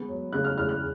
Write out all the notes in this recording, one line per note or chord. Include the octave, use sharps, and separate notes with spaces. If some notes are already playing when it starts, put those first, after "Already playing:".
Already playing: G#3 B3
F#3
C#3 F#6
F6
E2 F6
F#6